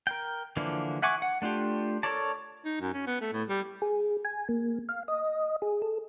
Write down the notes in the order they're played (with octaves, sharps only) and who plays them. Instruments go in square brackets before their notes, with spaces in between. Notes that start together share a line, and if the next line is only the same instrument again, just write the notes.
[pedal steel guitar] A#4 G5
D3 E3 F3 A#3 D4
E5 F#5 G#5 C#6 D6
F#5
A3 D4 F4 G4
A4 A#4 C#5 D5 A5
[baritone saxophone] D#4
F#2
C#4
B3
A3
A2
G3
[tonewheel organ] G#4
G#5
A#3
F5
D#5
G#4
A4